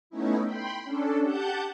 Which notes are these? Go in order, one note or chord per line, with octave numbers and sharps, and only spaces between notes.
A3 B3 C#4 D#4 E4
G5 B5 C6
C#4 D4 A4
G4 F#5 A5 G6